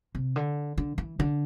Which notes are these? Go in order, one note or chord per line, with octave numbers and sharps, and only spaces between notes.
C3
D3
D3
E3
D3